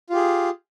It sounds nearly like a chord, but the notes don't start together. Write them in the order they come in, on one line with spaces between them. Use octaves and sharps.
F4 G4 G#4